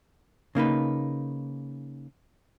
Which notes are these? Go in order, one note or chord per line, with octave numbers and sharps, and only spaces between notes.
C#3 A#3 D#4 B4